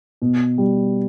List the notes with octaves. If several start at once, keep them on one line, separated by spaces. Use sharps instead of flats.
B2
G3